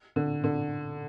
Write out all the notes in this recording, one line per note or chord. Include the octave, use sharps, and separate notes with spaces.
D3
D3